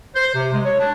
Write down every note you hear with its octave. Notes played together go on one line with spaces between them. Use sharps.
C5
C3
G#3
C#5
D4